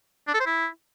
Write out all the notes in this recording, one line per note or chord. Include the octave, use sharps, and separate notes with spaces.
D4
A4
C5
E4